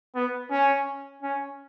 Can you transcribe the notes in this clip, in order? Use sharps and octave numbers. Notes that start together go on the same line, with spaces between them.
B3
C#4
C#4